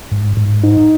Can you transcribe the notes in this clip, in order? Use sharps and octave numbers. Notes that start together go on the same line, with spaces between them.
G#2
G#2
D#4